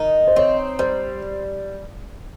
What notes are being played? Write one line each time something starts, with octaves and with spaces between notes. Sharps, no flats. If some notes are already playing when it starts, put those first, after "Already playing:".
Already playing: D#3 D#4 D#5
C5
C4 C#5
G3 C5